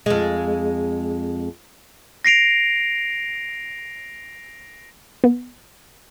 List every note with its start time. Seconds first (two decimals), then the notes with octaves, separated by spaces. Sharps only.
0.06 F2 G#3
2.25 A#6 C7 D7 F7
5.24 B3